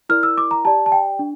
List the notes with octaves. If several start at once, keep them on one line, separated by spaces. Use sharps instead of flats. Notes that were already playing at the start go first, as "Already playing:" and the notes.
E4 A#4 D5 F6
E6
D6
A#5
G4 D5 A5
A5
G5
D4